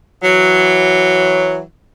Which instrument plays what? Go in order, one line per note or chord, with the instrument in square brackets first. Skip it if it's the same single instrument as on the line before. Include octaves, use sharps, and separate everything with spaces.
[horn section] E3 F#3